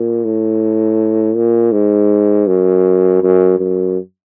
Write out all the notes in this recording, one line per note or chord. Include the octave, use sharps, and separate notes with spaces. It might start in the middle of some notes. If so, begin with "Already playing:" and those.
Already playing: A#2
A2
A#2
G#2
F#2
F#2
F#2